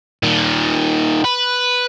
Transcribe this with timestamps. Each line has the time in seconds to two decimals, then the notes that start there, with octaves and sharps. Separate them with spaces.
0.23 A#2 D#3
1.25 B4